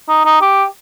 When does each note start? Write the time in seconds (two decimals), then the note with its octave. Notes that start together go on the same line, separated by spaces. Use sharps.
0.09 D#4
0.25 D#4
0.41 G4